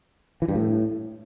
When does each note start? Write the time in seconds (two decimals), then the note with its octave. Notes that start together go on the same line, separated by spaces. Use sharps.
0.42 E3
0.48 G2
0.55 A2